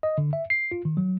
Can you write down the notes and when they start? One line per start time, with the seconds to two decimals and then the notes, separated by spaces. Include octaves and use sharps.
0.03 D#5
0.18 D3
0.33 E5
0.50 C7
0.72 F4
0.85 D#3
0.97 F#3